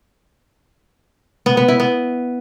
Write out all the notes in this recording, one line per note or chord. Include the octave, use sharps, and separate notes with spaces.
B3
B3
E4
B3